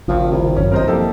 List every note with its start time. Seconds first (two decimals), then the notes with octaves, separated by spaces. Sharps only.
0.08 G#1 D2 C#3 F3
0.31 C2
0.56 G1 F#2 C#4
0.72 C2 A#4 C5 D#5
0.88 F3 A#3 G4 A4